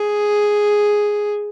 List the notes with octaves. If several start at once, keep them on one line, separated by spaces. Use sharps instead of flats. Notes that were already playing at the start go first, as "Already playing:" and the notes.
Already playing: G#4